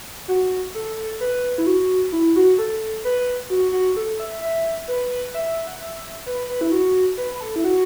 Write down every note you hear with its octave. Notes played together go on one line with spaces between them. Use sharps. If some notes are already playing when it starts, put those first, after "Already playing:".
F#4
A4
B4
E4
F#4
E4
F#4
A4
B4
F#4
F#4
A4
E5
E5
B4
E5
F#5
E5
B4
B4
E4
F#4
B4
B4
A4
E4
F#4